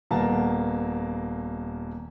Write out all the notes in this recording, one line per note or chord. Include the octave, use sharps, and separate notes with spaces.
D#1 A#3 B3 F#5 A5 A#5